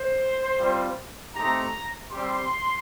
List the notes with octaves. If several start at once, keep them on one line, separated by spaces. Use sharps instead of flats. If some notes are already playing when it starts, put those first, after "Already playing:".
Already playing: C5
G3 C4 F4
A3 C4 D#4 G4 A#5
G3 C4 G4 C6